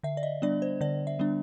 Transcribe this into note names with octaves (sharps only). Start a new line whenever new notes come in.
D3 E5
D5
D#5
G3 B3 D4 D5
C5
D3 D5
E5
G3 B3 D4